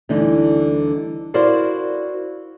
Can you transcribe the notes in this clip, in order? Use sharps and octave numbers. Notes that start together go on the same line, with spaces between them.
D2 D3 E3 G3 D#4
E4 F#4 A#4 C5 D5 F5